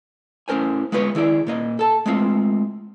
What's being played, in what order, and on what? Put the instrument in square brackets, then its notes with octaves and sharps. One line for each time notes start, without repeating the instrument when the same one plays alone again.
[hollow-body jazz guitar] A2 C#4 A#4 C5 G#5
G#3 B3 F4 B4 C#5
D#3 E4 G#4 D5
A#2 A#3 D#5
A4 A5
G#3 A3 C4 F4